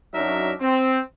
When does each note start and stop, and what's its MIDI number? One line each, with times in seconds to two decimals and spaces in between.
0.14 0.53 42
0.14 0.53 54
0.14 0.53 62
0.14 0.53 63
0.14 0.53 70
0.14 0.53 76
0.61 0.99 60